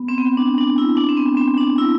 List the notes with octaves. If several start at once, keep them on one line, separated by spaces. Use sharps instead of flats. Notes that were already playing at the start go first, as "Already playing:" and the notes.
Already playing: B3
C4
B3
D4
D4
E4
D4
C4
B3
C4
D4
E4